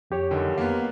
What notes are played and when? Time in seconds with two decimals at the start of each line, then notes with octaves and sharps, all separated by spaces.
0.11 F2 G4 C#5
0.31 F#1 D3 D#3
0.58 A#3 B3